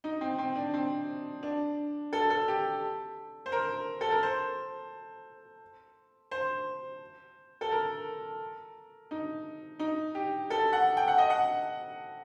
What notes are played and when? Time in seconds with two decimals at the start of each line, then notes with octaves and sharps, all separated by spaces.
0.04 D#4
0.21 C4
0.38 C4
0.56 D4
0.74 C4
1.43 D4
2.13 A4
2.30 A4
2.48 G4
3.46 C5
3.52 A#4
4.01 A4
4.11 A#4
4.23 C5
6.31 C5
7.61 A4
7.71 A#4
9.11 D#4
9.79 D#4
10.15 G4
10.50 A4
10.73 F#5
10.97 G5
11.08 F#5
11.18 D#5
11.30 F#5